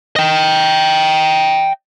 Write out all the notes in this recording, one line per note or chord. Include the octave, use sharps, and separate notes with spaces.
D#5 G5